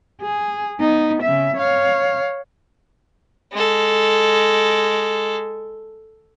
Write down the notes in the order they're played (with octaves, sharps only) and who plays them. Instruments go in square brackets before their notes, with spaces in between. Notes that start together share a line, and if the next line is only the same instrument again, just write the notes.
[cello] G#4
B3 D#4
C#3 E5
C#5 F5
[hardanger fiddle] G#3 A4